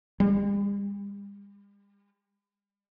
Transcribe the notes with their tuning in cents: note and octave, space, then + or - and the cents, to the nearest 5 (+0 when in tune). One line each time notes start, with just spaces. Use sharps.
G3 +40